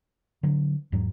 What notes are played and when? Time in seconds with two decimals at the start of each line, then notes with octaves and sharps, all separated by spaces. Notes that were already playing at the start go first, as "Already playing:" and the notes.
0.43 D3 F#3
0.92 E2 G#2 F#3